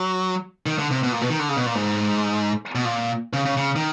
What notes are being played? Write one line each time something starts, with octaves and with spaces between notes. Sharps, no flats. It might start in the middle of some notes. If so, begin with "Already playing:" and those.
Already playing: F#3
D#3
D3
C3
B2
A#2
B2
D#3
D3
C#3
B2
A#2
G#2
B2
A#2
C#3
C#3
C#3
D#3